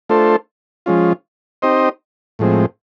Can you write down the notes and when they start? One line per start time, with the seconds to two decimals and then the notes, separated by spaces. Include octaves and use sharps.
0.09 A3 D4 F4 A4 C5
0.86 F3 G#3 C#4 F4
1.62 C4 D#4 G4 C5 D#5
2.39 A2 F3 G#3 C4